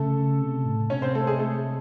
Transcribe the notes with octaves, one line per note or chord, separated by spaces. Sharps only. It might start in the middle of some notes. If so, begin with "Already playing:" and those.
Already playing: C#3 A3 A4
C3
A2
C3 C#4 C#5
C4 C5
A3 A4
G#3 G#4
A3 A4